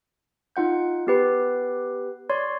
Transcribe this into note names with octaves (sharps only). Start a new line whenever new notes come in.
D#4 F4 F#5 G6
B3 G4 B4
C#5 D5 C6